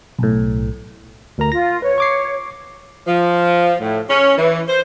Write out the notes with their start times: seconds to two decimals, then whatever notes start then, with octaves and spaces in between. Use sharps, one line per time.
0.19 B1 A2
1.38 D2 A#4 A#5
1.52 F4 A#6
1.82 B4 C#5
1.98 C#6 D6 C7
3.06 F3
3.81 A2
4.09 C#4
4.38 E3
4.68 C5